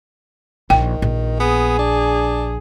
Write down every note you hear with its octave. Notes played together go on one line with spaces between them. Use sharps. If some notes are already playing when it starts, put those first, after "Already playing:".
A#1 D#3 G5
A#1
B3 G#4
D4